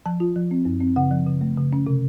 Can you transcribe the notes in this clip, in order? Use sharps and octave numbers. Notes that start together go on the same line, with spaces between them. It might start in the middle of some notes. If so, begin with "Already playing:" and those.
F3 A5
F4
F3
C4
F#2
C4
C#3 F#5
F3
C#3
A3
C#3
C#4
C3